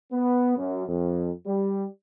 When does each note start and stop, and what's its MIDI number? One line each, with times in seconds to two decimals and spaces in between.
0.11 0.53 59
0.56 0.84 42
0.87 1.30 41
1.45 1.85 55